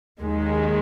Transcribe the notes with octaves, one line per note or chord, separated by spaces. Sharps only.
D#2 D#3 G#3